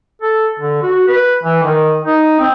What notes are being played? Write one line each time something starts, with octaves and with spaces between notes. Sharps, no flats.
A4
D3
F#4
B4
E3
D#3
D#4
C4